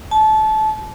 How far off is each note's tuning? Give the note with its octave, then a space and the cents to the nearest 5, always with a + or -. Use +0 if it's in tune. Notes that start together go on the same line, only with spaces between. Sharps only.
A5 -25